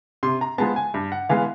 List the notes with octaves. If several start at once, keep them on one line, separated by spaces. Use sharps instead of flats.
C3 C6
A#5
F3 G#3 B3 A5
G#5
G2
F#5
E3 G#3 B3 F5